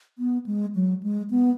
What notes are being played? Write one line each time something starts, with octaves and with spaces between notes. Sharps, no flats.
B3
G#3
F#3
G#3
B3